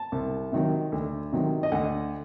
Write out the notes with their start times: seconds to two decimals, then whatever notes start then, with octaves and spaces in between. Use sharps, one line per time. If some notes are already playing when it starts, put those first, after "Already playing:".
Already playing: A5
0.12 C2
0.52 C3 D#3 F#3
0.92 D2
1.32 C3 D#3 F#3
1.63 D#5
1.72 D2 F#5